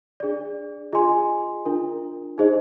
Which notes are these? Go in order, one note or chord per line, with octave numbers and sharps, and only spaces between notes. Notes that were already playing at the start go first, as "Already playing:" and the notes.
D4 G#4 D5
F4 G#4 D#5 G#5 C6
D4 F4 A#4
D#4 G#4 C5 D#5